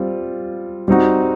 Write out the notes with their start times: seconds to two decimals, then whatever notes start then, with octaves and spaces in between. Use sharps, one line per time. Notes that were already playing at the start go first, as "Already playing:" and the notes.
Already playing: G3 C4 F4
0.88 G3 C4 D#4 F#4